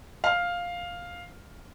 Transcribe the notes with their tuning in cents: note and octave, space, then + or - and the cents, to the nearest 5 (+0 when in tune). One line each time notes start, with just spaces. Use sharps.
F5 +5